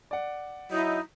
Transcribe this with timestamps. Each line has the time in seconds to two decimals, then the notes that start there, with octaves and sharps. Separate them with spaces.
0.11 D5 F#5
0.71 F#3 D#4 E4